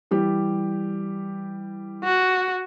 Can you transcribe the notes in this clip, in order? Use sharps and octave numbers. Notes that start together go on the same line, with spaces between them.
E3 G3 G4
F#4